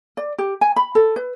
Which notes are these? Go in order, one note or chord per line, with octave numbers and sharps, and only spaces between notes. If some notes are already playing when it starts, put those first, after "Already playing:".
D5
G4
G#5
B5
A4
B4